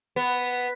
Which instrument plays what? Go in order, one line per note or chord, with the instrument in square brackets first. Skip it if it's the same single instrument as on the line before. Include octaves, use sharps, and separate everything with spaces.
[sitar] B3